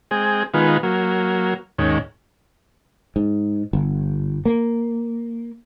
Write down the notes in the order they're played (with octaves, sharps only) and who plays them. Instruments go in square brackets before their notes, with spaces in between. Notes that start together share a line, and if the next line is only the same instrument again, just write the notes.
[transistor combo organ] G#3 C4 G#4
D#3 G#3 B3 F4
F#3 A#3
D#2 G#2 C#4
[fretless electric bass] G#2
G1
A#3